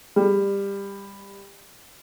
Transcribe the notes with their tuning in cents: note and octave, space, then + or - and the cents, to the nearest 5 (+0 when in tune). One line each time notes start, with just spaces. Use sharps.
G3 +20